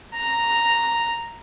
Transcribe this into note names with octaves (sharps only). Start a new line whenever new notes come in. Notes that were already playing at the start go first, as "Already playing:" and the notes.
A#5